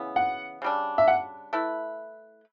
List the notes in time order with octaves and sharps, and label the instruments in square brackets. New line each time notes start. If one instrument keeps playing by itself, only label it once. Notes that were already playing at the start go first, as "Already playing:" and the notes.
Already playing: [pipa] C#3 E3 B3
[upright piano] F#5
[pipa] C#3 G3 D4
[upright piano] E5
F#5
[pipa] A3 E4 B4